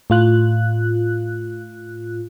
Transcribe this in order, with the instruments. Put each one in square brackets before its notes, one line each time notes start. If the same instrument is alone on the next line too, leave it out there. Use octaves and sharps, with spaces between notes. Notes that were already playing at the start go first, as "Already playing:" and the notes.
[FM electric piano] A2 F4 F#6